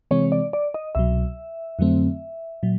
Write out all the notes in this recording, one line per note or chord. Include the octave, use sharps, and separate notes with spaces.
C3 E3 G#3 C4 C#5
D5
D5
D#5
C2 B2 F#3 E5
F2 D3 F#3 A3 C4
A#2 F#3